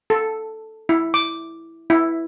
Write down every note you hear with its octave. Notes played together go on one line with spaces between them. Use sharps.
A4
E4
D6
E4